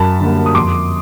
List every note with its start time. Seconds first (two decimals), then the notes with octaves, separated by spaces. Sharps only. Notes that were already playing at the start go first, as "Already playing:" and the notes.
Already playing: F#2 A5 B5
0.20 D3 G3 A#3
0.46 D#6
0.55 F2 C6 D6